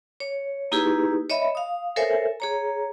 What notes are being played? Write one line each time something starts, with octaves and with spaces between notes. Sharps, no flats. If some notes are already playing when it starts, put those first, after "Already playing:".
C#5
A#3 D#4 E4 G4 G#4 B4
C#5 D#5 E5 B5
F5 D#6
A4 A#4 C5 C#5 E5 G#5
G#4 C#5 A#5